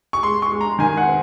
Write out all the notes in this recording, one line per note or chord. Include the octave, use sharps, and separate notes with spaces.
C#6
G#3 C6
C#6
G#3
A#5
D#3 G#5
F#5
C4